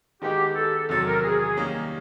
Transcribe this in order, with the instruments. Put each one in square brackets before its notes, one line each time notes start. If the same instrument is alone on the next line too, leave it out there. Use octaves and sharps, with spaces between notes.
[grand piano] D#3 G#3 B3 D#4 F#4 [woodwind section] G4
[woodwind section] A4
[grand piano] E2 C3 D#3 F#3 [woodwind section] A4
[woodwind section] A#4
G#4
G#4
[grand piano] D#3 G3 A#3 C#4